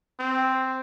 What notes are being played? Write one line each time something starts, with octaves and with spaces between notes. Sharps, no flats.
C4